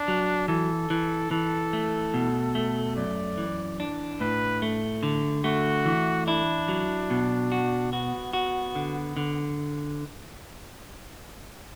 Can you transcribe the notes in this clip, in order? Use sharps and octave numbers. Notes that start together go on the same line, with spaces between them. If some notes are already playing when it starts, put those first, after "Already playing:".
Already playing: D4
F#3
E3 A4
E3
E3 A4
A3
B2
A3
F#2 D5
E3
D4
A2 B4
A3
D3
A3 F#4
E3
D4 E4
F#3
B2
F#4
B3 F#4
F#4
D3
D3